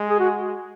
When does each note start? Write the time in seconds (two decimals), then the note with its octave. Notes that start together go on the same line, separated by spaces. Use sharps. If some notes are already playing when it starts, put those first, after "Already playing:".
Already playing: G#3
0.10 G#4
0.20 F#4